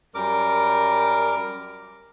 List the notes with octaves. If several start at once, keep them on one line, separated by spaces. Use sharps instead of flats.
F#2 G3 A#4 D6